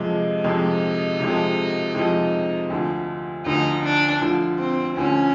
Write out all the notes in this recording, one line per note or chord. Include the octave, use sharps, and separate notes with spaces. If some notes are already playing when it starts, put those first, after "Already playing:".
Already playing: F2 C3 F3 G#3
F2 C3 F3 G#3 D#4
F2 C3 F3 G#3
F2 C3 F3 G#3
D2 D3 F3
D2 D3 F3 D#4
D4
D2 D3 F3
C4
D2 D3 F3 C#4